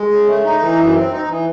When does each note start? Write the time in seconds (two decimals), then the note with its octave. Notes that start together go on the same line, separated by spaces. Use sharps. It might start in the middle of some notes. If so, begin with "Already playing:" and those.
Already playing: G#3
0.11 C#3
0.27 A3
0.45 D#4
0.61 E3
0.78 F#2
0.94 C4
1.12 D#4
1.28 E3